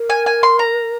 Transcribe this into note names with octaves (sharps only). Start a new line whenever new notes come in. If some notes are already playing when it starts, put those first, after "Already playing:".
Already playing: A#4
G#5
G#5
C6
A#5